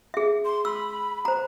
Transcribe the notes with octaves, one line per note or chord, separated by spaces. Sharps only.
G#4 E5
C6
B5 E6
C5 A#5